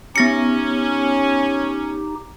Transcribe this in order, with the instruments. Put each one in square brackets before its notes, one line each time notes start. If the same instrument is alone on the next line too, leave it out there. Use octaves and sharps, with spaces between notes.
[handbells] B3 A#6 C#7 [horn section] C#4 [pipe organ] D#4 G4